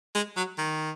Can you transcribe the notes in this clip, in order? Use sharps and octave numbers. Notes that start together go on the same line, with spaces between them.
G#3
F#3
D#3